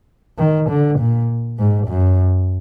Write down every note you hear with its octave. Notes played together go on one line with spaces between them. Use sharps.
D#3
D3
A#2
G#2
F#2